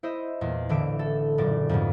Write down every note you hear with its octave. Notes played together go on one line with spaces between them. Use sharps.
E4 C5 D#5 E5
E2 A#2 A#3
A1 D3 E5 D7
A4
F#1 A#2 D4 D5 D7
F2 G#2 B2